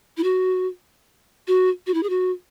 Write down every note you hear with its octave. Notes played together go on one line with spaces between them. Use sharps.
E4
F#4
F#4
F#4
E4
G#4
F#4